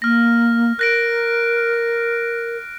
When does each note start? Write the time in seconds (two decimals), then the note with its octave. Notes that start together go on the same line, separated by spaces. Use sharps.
0.02 A#3 F6 A#6
0.79 A#4 F#6 A#6 D7